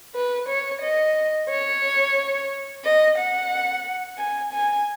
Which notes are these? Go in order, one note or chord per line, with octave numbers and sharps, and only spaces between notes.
B4
C#5
D#5
C#5
D#5
F#5
G#5
G#5